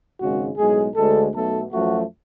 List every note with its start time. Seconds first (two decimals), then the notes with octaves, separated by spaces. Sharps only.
0.20 G#1 F#2 C#3 G#3 F#4
0.57 B1 A2 G#3 G#4
0.95 D2 D3 G#3 A4
1.33 B1 B2 A3 A4
1.71 F#2 F3 A3 F#4